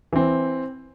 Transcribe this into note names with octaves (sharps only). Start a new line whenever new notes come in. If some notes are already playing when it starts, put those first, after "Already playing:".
E3 C4